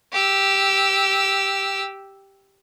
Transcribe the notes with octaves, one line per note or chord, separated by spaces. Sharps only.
G4 E6